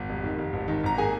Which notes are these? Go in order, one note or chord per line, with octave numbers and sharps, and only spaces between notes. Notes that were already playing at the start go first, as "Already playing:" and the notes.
Already playing: G#1
F1
D#3
F1
G#1
D#3
G#1 A#5
A#3 G#4 G#5